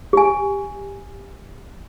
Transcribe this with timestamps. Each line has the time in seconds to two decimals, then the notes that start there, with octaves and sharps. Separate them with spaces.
0.13 G4 G#5